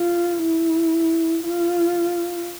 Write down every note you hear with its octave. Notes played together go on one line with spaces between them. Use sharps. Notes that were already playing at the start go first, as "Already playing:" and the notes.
Already playing: F4
E4
F4